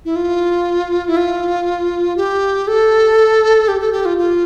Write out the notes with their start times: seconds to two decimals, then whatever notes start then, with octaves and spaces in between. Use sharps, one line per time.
0.05 E4
0.16 F4
1.08 E4
1.17 F4
2.17 G4
2.68 A4
3.68 G4
3.80 A4
3.92 G4
4.05 F4
4.18 F4